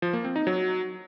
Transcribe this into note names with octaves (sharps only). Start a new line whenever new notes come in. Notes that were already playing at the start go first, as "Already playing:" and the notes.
F3
A#3
C4
D#4
F#3